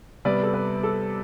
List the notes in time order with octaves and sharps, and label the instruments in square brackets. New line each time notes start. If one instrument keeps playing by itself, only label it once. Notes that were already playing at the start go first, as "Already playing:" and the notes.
[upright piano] C3 G3 B3 B4 D5
A4
B4
A4